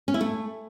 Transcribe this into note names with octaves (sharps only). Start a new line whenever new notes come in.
C#4
E4
A3